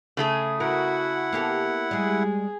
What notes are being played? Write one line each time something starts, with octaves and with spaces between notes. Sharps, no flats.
C#3 A3 G#4
E4 F#4 A#4 F#5
A#3 B3 G4 A4
G3 G#3 G#4